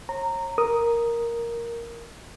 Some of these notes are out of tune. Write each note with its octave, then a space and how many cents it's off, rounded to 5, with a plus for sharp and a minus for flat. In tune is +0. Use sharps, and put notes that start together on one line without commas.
C#5 -40 A#5 -15
A#4 +0 D#6 +0